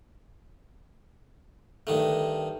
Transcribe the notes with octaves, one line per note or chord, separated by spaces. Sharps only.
G2 D#3 A3